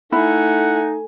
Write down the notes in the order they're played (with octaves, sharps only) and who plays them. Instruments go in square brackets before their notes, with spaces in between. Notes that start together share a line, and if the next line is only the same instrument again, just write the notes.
[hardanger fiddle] A3 G#5 [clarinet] D#4 [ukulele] E4 [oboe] F#5